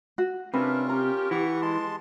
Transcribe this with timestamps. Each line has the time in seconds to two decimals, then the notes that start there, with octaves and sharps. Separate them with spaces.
0.18 F#4
0.54 C3 C#4 D4 F4 A#4 B4
0.90 G4 A#5
1.31 E3 F#5 C#6
1.62 G#3 A5 C6